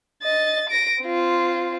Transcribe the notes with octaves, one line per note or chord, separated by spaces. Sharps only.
D#5 A6
A#6 D7
C4 F4